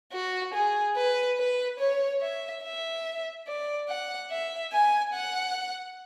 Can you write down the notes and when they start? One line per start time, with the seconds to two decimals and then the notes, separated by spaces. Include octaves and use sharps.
0.13 F#4
0.54 G#4
0.96 B4
1.38 B4
1.79 C#5
2.21 E5
2.64 E5
3.47 D5
3.89 F#5
4.31 E5
4.73 G#5
5.14 F#5